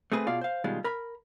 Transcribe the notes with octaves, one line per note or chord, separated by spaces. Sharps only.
A3 C4 G#4 B4
B2 F4 G#4 D5 F5
C5 F5
B2 D#3 G3 G#3 F4
A#4 B5